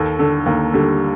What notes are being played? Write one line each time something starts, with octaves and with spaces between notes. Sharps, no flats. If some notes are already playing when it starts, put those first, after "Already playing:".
Already playing: D#2 A4
D3 A4
D#2 A#3
D3 G3